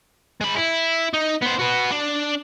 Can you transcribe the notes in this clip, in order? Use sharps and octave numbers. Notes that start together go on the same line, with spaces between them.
G#3 B5
E4
D#4
B3 C5
F#4 B4
D4